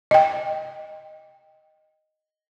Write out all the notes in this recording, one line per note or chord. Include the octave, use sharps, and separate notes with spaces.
D#5 G5